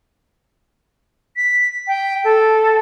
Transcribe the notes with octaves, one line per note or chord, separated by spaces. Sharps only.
B6
G5
A4